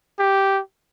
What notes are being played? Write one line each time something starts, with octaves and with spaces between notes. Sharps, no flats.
G4